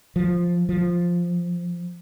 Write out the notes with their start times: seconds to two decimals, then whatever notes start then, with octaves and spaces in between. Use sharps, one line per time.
0.16 F3
0.69 F3